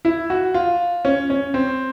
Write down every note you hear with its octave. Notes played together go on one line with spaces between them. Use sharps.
E4
F#4
F4
C#4
C#4
C4